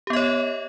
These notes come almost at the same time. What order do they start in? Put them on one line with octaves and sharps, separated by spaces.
G4 B3 D#5 C#5